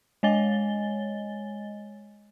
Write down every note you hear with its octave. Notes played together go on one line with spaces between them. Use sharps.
G#3 C#5 D#5 G#5 A6 G7